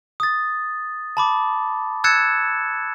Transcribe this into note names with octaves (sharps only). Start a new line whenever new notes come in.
D#6 A6
A5 B5 D6
E6 F#6 G#6 A6 C#7 E7